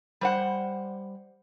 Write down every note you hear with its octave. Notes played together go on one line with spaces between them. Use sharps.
G3 C5 F#5